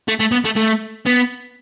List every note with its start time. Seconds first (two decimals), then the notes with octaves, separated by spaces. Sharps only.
0.08 A3
0.20 A3
0.32 B3
0.45 A3
0.56 A3
1.06 B3